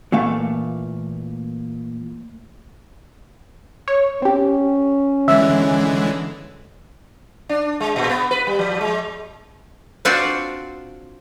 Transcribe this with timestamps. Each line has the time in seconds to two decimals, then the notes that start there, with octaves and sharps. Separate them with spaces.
0.12 A#2 E3 A3 F5
3.88 C#5
4.22 C4 C#4 G4
5.28 D3 E3 G#3 E5
7.49 D4
7.80 G#3
7.96 A#2
8.09 B3
8.31 B4
8.47 G3
8.59 F3
8.81 G#3
10.05 C4 D4 F4 F#4 C5 D5